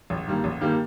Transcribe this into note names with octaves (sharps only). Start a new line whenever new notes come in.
A1
G2 D#3 G3 A#3
A1
G2 D#3 G3 A#3